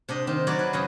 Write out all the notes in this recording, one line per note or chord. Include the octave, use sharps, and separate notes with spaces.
C3 D4 D#5
D#3 C4
F#3 E4 C#5 D5
B4
F#2 C#3 B3 G#5